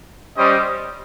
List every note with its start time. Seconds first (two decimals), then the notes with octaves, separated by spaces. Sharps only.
0.36 G3 C#4 G4 C5 D#5